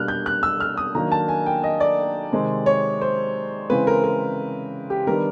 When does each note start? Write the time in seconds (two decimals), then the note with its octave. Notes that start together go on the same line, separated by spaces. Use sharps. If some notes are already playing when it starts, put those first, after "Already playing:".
Already playing: B2 G3 A#3 D4 F6 F#6
0.08 G6
0.26 F#6
0.43 E6
0.60 F6
0.77 D#6
0.95 D#3 F#3 A#3 D4 A#5
1.12 A5
1.29 G#5
1.46 G5
1.64 D#5
1.80 D5
2.32 C3 D#3 G#3 C4
2.66 C#5
3.01 C5
3.70 C#3 E3 G#3 C4 B4
3.87 A#4
4.04 A#4
4.90 G4
5.07 D#3 G3 B3 D4 A#4